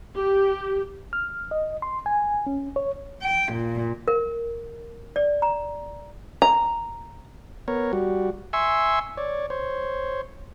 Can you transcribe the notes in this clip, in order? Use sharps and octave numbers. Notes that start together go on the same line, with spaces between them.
G4
F6
D#5
C6
G#5
C#4
C#5
G5
A#2
A#4
D5
A#5
A#5
B3 A#4 C#5
G3 F#4
E5 G#5 C6 C#6 E6
C#5 D5
C5 C#5